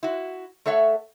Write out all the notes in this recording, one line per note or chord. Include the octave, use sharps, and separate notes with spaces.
E4 F#4
A3 A4 C#5 E5 F#5